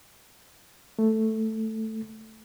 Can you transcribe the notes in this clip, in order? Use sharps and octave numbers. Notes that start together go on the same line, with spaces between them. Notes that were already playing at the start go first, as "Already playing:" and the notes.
A3